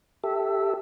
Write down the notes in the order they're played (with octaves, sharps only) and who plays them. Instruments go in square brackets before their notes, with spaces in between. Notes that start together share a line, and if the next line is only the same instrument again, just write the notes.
[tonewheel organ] G4 A4 E5